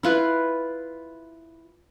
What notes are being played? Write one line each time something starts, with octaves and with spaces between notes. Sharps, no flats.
E4 F4 B4